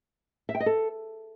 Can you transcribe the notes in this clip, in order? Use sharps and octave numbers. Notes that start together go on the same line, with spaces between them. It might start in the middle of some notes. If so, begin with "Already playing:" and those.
E5
G5
D#5
A4